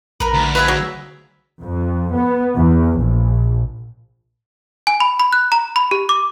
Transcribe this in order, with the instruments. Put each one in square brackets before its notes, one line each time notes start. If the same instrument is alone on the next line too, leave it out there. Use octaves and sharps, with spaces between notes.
[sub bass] A#1 [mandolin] A#4 B4
[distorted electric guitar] D2
[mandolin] G#4 E5 F5 [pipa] B4
[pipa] F#3
[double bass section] F2
B3
E2
A#1
[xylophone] G#5
B5
B5
F#6
A#5
B5
G4
D6